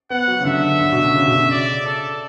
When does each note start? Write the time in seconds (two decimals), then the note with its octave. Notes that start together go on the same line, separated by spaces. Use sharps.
0.10 B3 F#5
0.28 F#3
0.40 C#3
0.45 D3 E5
0.81 D3
0.92 B2
1.04 C#3
1.15 C#3
1.27 B2
1.39 C#3
1.51 D5
1.86 A4